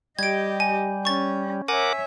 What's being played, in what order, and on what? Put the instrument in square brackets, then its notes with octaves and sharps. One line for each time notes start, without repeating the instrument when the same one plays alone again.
[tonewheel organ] G3 [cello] G4 D#5 [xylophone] G#6 D7
[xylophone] G#5
[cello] C#4 [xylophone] C#6 A6
[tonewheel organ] A#4 F#5 D6 [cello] C#5 E5 [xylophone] G#5